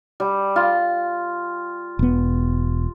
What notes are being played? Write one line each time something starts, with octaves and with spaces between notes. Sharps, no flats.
G3
F4
E1 B3